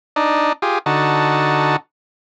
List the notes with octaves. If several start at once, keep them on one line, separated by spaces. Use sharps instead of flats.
D4 D#4
F4 G4 G#4
D3 D#4 F#4 A5